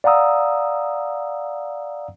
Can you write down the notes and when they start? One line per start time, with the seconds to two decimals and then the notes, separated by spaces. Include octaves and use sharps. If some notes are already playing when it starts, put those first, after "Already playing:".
0.04 D5 F5 F#5 A#5 D#6 E6